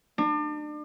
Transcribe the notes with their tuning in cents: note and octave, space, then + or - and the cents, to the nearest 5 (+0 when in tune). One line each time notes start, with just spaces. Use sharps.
D4 +35